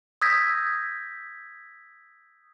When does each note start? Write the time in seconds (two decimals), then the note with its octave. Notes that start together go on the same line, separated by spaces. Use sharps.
0.22 D#6 E6 G6 G#6 A#6 B6